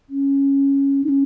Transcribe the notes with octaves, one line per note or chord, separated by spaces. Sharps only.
C#4
D#4
C#4